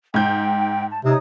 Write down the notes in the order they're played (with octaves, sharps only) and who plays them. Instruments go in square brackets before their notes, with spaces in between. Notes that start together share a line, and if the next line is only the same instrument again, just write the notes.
[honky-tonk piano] G#2 G6 [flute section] G5
[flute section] A5
[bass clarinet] C3 [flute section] D#4 C#5 D#6